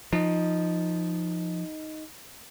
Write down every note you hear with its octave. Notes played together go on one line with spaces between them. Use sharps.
F3 D#4 D#5